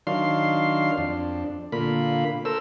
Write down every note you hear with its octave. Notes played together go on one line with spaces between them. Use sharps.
D#3 F#3 D4 F5 C6
F2 D4
A#2 D3 A#3 F4 B5
A4 A#4 C5 E6